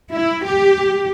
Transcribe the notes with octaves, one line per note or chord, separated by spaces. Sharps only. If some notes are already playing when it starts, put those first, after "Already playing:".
E4
G4